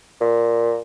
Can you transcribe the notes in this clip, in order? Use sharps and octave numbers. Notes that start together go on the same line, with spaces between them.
A#2